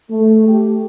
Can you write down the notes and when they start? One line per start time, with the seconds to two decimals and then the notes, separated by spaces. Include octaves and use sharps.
0.10 A3
0.46 G4